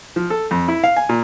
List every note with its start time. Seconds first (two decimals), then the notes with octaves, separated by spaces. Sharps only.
0.16 F3
0.30 A4
0.51 F2
0.68 E4
0.84 F5
0.97 G#5
1.09 A#2